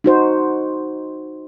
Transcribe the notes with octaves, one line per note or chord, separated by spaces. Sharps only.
D#4 F#4 C5